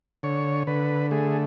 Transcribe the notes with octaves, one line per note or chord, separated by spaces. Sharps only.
D3 C#5
D3 B4
A3 G#4